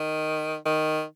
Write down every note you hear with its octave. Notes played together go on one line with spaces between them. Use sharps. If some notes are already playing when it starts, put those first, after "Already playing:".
Already playing: D#3
D#3